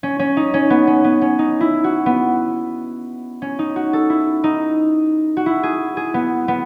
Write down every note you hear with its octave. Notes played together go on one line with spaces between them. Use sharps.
C#4
C#4
D#4
C#4
B3
C#4
B3
C#4
D#4
E4
F#4
B3
C#4
D#4
F#4
A4
E4
D#4
F#4
E4
G#4
G#4
B3
B3